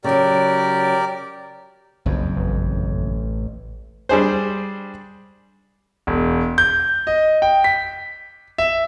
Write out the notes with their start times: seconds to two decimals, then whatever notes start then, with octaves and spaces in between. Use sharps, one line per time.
0.04 C#3 F#3 G4 A#4 D5
2.06 F#1 B1 F2
2.37 A1
4.09 G3 D4 G#4 C5
6.07 E1
6.58 G6
7.07 D#5
7.42 G5
7.64 B6
8.58 E5